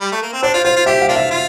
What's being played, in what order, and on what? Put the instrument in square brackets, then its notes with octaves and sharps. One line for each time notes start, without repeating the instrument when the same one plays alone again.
[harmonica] G3
A3
A#3
C4
[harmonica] D4 [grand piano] C5
[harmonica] F4
[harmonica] F4 [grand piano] C5
[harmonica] F4
[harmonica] G4 [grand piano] E5
[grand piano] F5
[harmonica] A#3 D4 F4
[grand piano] E5
[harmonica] F4